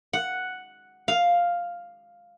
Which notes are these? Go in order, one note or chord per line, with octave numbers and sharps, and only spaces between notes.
F#5
F5